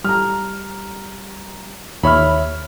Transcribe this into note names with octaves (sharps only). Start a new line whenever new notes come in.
G3 A#5 F6
D#2 C#5 E5 B5 F6